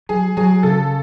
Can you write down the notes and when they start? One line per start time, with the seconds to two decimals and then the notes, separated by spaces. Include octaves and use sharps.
0.09 F#3 G#4
0.37 F#3 G#4
0.63 C#3 A4